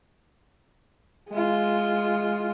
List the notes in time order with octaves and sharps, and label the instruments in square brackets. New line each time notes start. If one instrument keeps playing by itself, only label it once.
[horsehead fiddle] G#3 F4